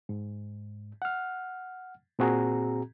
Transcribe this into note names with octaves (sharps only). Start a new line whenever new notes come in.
G#2
F#5 F6
A#2 C4 F#4 G#4 A#5